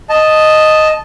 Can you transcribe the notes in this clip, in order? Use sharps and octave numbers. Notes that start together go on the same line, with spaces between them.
D#5 A5